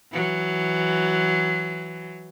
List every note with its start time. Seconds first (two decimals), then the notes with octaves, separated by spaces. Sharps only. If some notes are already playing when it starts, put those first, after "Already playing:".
0.12 E3 F#3